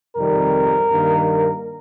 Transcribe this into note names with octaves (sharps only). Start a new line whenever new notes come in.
F2 C3 D#3 G3 A#4
G2 D#3 A#3